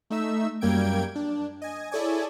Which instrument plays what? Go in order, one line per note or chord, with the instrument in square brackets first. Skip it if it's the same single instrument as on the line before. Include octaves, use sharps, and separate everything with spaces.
[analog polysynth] A3 D#4 E5 E6
F#2 G3 A#3 G5 G#6 D7
D4
D#5 G#5
E4 G#4 A4 C#5 D5 G#5